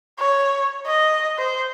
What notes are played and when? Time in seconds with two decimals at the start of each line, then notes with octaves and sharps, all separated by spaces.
0.19 C#5
0.86 D#5
1.38 C5